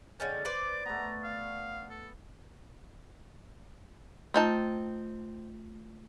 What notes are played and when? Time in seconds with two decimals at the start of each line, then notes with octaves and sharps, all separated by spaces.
0.20 D3 G#3 C#4 G5 A6
0.45 B4 C5 D5 D6
0.86 A3 B3 A#5
1.24 F5
1.90 A4
4.34 A3 C4 D#4 F4 A5 G6